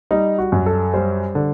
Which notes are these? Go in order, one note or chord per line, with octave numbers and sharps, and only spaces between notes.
G3 D#4
F#4
F#2
A4
G3 C5
D3